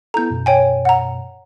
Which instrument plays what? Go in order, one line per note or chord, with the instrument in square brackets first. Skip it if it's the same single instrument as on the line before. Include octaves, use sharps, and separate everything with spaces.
[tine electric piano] B3 E4 A4 [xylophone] A#5 G6
[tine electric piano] F#2 B2
[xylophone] C#5 G5 G#5
F#5 A#5